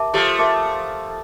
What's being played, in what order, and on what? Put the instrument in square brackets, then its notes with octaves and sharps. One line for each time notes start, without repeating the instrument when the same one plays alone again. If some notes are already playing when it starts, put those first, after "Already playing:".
Already playing: [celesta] G4 A#4 E5 A5 D6
[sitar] F3 A3 [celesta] G4
[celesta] A#4 E5 A5 D6